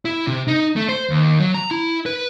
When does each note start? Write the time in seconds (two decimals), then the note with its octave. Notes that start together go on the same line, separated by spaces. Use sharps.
0.05 E4
0.27 C3
0.48 D#4
0.76 A3
0.89 C5
1.10 D#2
1.40 F#3
1.54 A#5
1.71 E4
2.06 B4